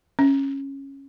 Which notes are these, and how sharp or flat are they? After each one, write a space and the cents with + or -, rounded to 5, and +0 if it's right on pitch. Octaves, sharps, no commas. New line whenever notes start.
C#4 -10